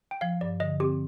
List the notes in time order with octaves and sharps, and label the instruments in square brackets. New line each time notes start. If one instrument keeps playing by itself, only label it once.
[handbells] G5
[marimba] F3 [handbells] F5
[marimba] G2 [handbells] D5
[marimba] D3 [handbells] D#5
[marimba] C4 [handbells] G4